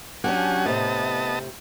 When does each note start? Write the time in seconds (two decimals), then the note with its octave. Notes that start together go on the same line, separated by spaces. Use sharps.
0.24 F#3 C#4 D4 G4 F#5 G#5
0.66 A2 C3 B3 D#5 A5